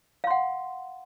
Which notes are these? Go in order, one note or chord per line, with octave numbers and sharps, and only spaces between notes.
F5 F#5 C6